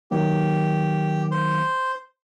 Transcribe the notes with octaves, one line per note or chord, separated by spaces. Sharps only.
D#3 F#3 A#3 G4
C5